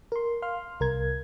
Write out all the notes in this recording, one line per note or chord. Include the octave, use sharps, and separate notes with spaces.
A#4 C6
F5 C6 F6
C2 A#4 G#6